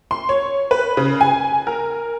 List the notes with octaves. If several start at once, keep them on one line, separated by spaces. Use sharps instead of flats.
C6
C#5
B4
C#3
G#5
A#4